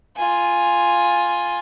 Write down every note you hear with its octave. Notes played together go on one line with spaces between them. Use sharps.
F4 G#5